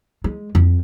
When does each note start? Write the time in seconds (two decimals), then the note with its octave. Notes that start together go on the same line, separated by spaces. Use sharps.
0.24 G#3
0.55 F2